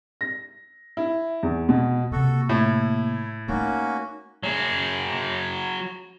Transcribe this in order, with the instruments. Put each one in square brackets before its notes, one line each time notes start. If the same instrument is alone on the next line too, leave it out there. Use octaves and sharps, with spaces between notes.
[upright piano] A#6
E4
E2
B2
[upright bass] C3 A#3 [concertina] F#4 A4
[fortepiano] A2 [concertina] E4
[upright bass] A3 D#4 [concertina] A#3 C#4 F#4
[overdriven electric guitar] F#3 G#4